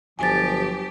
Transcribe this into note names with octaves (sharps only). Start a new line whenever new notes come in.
G1 F3 F#3 G4 G#5 A6